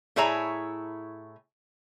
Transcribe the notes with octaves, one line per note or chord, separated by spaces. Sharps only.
A2 E4 G#4 C#5 E5 A#5